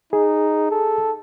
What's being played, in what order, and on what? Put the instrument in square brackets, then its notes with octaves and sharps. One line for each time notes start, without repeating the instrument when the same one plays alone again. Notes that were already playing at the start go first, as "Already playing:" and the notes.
[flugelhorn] D#4 [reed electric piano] G#4
[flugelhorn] A4